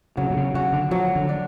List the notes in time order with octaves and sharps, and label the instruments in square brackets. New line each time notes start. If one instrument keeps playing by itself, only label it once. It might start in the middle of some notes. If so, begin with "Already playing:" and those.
[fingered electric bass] C#3 [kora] F#3
[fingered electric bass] B2
C#3
[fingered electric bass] C#3 [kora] F#4
[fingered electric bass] D3
[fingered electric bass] F3 [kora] F#3
[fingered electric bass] D3
[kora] D4